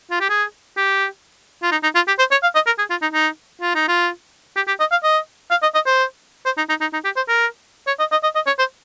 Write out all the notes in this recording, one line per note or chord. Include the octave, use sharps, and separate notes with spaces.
F4
G4
G#4
G4
F4
D#4
D#4
F4
G4
C5
C#5
F5
D#5
A#4
G#4
F4
D#4
D#4
F4
D#4
F4
G4
G4
D#5
F5
D#5
F5
D#5
D#5
C5
C5
D#4
D#4
D#4
D#4
G4
C5
A#4
C#5
D#5
D#5
D#5
D#5
C#5
C5